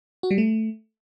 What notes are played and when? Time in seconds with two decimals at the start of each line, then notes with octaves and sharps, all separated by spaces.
0.23 F#4
0.31 G3
0.38 A3